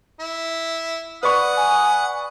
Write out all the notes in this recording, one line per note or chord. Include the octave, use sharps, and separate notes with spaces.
E4
B4 D5 F#5 C#6 D#6
G#5